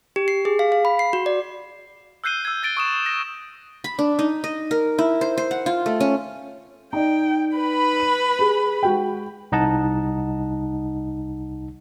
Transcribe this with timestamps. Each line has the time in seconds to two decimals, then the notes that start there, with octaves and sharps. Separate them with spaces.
0.16 G4
0.28 C7
0.45 G#4
0.59 F5
0.72 F5
0.85 B5
0.99 C7
1.13 F#4
1.26 D5
2.24 E6 F#6 G6 C7 D#7 G7
2.45 E6 G#6
2.63 G6 A6 D7 G7
2.77 C#6 D#6 E7
3.06 A#6
3.84 B5
3.99 D4
4.19 D#4
4.44 D#5
4.71 A#4
4.99 E4
5.21 C5
5.38 C5
5.51 F#5
5.66 F4
5.86 A3
6.00 C#4
6.93 D#4 D5 G5
7.57 B4 B5
8.00 D#7
8.39 G#4
8.83 G#3 F#4 G5
9.52 C2 D#4 D#5 F#5 A5